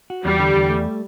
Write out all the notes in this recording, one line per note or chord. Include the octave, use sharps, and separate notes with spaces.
F#4
E2 G3
D3
E2
A3